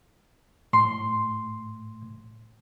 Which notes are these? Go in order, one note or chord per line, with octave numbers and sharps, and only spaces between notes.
A2 C6